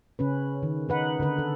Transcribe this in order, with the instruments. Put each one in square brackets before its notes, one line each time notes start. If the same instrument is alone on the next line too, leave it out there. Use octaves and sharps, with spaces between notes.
[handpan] C#3 C#4 B4
D#3
D#4 B4 F#5
D3 B4
A4